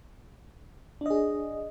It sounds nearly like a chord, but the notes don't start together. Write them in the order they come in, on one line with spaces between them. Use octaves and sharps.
D4 D#5 G#4